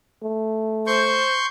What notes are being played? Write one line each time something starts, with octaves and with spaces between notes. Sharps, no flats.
A3
C5 C6 C#6 G6